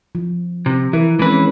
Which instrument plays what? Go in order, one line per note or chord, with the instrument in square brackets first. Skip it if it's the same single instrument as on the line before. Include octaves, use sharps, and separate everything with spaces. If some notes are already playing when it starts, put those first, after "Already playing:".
[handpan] F3
[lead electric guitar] C3
[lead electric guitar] E3 [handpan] E4 A#4
[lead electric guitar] E3 B4 [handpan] G#3 C4 C#4